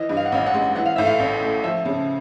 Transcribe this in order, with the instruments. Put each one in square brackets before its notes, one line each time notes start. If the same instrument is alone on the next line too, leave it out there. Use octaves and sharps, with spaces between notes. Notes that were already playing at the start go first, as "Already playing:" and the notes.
Already playing: [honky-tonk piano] E3 [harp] D#5
[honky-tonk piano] G2
[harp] F5
F#5
[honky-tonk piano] A1 [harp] F5
[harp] F#5
[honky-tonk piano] G#3
[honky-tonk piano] E3 [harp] F#5
[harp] F5
[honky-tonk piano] A2 [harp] E5
[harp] F5
[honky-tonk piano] A1
A3
[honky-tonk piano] F3 [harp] E5
[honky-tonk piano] C#3